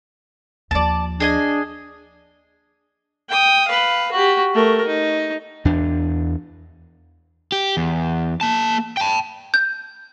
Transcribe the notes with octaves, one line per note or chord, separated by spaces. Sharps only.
D#2 F3 D5 A5
D4 G#4 D#5 G#5
G5 D#6
B4 F5
F#4 G4
A3 A#4
D#4
E2 D4
G4
E2
A#3 A5
G5 A5
G6